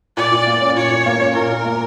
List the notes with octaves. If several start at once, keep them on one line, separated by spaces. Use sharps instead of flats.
A#2 D5
A#2
A#3
C#4
A#2 C#5
A#2
A#3
C#4
A#2 A#4
A#2
A#3